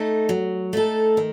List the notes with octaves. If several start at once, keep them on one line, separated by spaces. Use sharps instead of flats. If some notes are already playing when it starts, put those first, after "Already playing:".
Already playing: A3 D#4 A4
F#3
A3 D#4 A4
D#3